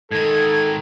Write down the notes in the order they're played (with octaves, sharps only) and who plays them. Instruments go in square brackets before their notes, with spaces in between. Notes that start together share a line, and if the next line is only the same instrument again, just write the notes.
[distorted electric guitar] G#2 D#3 [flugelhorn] A4 [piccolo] G#6